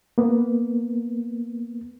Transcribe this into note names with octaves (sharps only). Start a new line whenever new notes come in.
A#3 B3